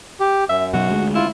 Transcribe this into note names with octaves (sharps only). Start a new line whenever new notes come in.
G4
F#2 E5
B2 F#3 F#4
D2 G#3
E4 F4